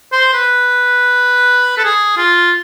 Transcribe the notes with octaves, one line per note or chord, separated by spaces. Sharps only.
C5
B4
A4
G#4
F4